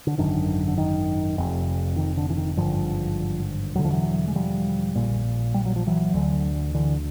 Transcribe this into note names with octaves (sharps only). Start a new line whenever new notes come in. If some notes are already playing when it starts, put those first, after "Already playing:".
D3
G#1 F#2 D3 D#3
D3
D#3
F1 F2 C3
D#3
D3
E3
D#3
G#1 G2 D3 F3
E1 D2 D3 F#3
F3
E3 F#3
G#3
F3 G3
A#1 A#2
G3
F#3
F3
E3 F#3
D2 D3
D3 E3